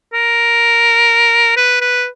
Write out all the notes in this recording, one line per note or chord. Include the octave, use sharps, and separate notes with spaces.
A#4
B4
B4